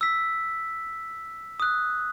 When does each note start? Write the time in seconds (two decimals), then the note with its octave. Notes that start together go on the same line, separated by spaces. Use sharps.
0.01 E6 B6
1.60 D#6 F#6